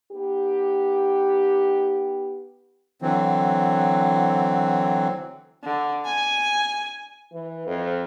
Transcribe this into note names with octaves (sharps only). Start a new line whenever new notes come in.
B3 D#4 G4
D3 E3 F#3 C4
D3
G#5
E3
F2